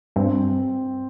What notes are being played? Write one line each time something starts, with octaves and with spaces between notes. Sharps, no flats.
G2 C4